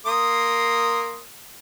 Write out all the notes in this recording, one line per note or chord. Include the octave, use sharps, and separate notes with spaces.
A#3 C6 D#6